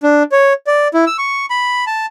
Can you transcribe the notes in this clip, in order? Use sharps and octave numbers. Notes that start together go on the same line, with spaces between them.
D4
C#5
D5
E4
E6
C#6
B5
A5